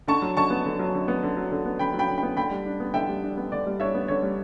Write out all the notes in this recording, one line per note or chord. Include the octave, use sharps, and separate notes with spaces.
D3 A5 C#6
F#3
D3 A5 C#6
B3
D3
F#3
D3
B3
D3
F#3
D3
B3
D3 G5 B5
F#3
G5 B5
D3
G5 B5
B3
D3 G5 B5
G3
D4
B3
D3 E5 G5
G3
D4
B3
D3 D5
G3
D4 C#5 E5
B3
D3 C#5
G3